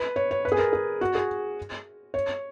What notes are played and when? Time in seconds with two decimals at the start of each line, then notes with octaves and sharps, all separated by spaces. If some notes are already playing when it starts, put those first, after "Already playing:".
Already playing: B4
0.16 C#5
0.31 C#5
0.45 B4
0.52 G#4
0.58 A#4
0.73 G#4
1.01 F#4
1.15 G#4
2.14 C#5